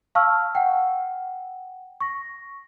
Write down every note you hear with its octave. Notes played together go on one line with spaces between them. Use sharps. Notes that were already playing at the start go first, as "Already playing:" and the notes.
F5 A5 C#6 E6 F6
F#5 G5
C#6 A#6